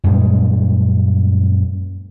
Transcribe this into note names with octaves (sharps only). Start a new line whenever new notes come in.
F#2 A#2 G3 G#3